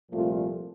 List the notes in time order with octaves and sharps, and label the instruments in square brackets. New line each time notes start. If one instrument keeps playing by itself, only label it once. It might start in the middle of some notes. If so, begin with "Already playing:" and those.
[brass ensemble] C2 A#2 F3 A3 F4